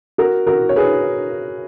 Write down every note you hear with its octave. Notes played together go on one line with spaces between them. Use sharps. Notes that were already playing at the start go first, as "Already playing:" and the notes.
F#4 A#4
F#4 A#4
C#5
G#4 B4